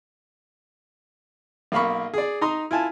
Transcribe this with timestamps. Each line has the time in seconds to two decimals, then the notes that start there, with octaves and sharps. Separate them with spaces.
1.72 B1 A#3 F5 B5 C#6
2.14 G#4 D5
2.41 D#4 A#5 C6 D#6
2.71 E4 F4 G#5 A5